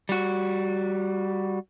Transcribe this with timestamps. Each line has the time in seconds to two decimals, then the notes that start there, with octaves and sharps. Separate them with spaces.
0.09 G3 F#4